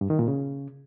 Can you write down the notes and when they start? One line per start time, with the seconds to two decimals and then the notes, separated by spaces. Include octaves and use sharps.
0.01 G2
0.10 D#3
0.19 A#2
0.28 C#3